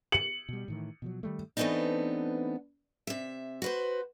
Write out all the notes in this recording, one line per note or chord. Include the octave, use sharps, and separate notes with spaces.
C#7 F#7
B2 G3
A2 D#3 E3
B2 F3 F#3
D#3 G3 A3
E3 A3 B3 C4 D4 D#4
C3 E5
F#4 B4 C5